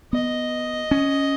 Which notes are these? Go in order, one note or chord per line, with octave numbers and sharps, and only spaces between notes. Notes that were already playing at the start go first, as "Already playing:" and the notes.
B3 D#5
C#4